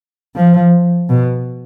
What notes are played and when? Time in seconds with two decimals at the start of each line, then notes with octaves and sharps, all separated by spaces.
0.36 F3
1.09 B2